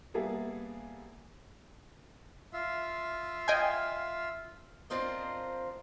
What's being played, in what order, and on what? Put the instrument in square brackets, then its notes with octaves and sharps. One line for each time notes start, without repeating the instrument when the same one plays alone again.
[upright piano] G3 A#3 B3 G#4 A4 E5
[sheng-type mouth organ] F4 E5 F5
[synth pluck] D#5 G5 G#5
[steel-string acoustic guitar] C4 D4 F4 A#4 C5 D#5